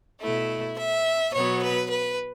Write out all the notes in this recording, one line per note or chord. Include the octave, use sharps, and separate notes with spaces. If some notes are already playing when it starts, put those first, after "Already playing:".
B2 A3 E4
E5
B2 F#3 B3 C#5
B4
B4